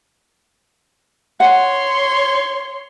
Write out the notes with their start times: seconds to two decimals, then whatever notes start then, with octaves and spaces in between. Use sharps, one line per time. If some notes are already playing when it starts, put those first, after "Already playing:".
1.40 C#5 F#5 C6